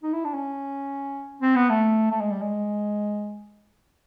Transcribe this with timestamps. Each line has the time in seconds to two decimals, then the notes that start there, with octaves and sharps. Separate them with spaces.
0.03 D#4
0.13 E4
0.25 D4
0.34 C#4
1.42 C4
1.56 B3
1.70 A3
2.11 A3
2.21 G#3
2.31 G3
2.42 G#3